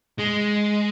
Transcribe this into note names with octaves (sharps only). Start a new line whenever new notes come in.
G#3